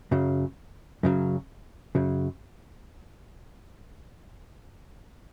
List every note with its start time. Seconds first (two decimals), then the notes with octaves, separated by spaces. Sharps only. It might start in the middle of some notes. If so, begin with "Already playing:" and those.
0.11 F#2 C#3 F#3
1.03 F#2 C#3 F#3
1.95 F#2 C#3 F#3